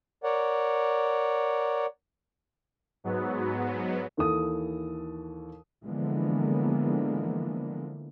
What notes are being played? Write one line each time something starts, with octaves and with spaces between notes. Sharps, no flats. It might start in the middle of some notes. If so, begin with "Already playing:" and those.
A#4 C#5 D5 F#5
G#2 F#3 B3
D#2 E3 A4 D#6
D3 E3 F3 G#3 A#3 B3